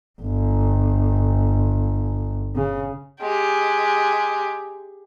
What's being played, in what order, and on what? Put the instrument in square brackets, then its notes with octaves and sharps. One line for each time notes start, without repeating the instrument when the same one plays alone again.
[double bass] G1
C#3
[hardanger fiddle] G#3 G4